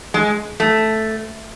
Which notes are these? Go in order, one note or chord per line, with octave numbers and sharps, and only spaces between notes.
G#3
A3